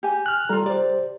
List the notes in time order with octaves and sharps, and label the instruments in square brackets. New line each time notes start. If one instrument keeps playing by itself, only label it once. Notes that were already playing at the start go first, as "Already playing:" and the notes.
[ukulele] G4 G#5
[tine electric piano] F6 F#6
[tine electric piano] G3 A4 [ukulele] F4 A#5
[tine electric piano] G4 C5 [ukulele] D5